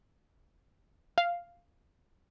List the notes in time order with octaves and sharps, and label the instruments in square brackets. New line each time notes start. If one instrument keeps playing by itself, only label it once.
[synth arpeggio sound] F5